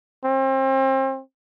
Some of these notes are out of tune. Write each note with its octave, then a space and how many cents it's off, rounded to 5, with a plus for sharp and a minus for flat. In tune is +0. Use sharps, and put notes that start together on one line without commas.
C4 +35